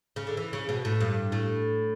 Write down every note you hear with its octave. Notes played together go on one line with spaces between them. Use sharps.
C#3
D3
E3
C#3
B2
A2
G2
A2